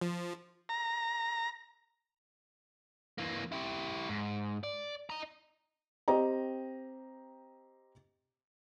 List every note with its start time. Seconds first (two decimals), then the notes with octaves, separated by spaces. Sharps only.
0.01 F3
0.69 A#5
3.18 E3 A#3
3.52 E4 G4
4.09 G#2
4.64 D5
5.10 D#5 A#5
6.08 C4 G4 D#5 A#5